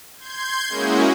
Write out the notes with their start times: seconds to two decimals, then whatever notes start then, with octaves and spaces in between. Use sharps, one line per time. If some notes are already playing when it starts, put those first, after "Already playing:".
0.18 C6 G6 G#6
0.69 G#3 A#3 C#4 E4 F#4 G#4